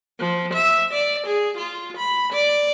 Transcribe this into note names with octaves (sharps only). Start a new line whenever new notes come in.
F3
E5
D5
G#4
F4
B5
D5